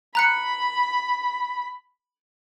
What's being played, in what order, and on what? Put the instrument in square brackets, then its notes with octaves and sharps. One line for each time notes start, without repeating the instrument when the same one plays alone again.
[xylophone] A#5 F#6 C#7 [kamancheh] B5